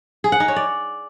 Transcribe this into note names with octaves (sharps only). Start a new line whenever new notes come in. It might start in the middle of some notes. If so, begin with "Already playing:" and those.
G#4
F#5
D#4
C#5
D5